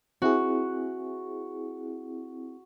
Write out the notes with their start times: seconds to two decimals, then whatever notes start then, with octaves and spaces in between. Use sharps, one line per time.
0.22 C4 E4 F#4 G#4